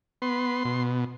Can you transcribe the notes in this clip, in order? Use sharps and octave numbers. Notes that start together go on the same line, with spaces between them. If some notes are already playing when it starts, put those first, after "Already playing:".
B3 C6
B2